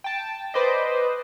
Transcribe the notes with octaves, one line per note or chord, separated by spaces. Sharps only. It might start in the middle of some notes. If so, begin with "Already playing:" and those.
G5 A5
B4 C5 D5 D#5